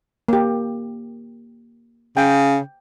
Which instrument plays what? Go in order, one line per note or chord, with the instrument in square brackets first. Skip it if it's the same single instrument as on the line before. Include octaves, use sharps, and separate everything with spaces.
[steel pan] A#3 G4
[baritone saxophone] C#3 [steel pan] G5